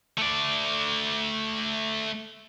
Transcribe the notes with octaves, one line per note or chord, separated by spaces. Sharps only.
A3 D5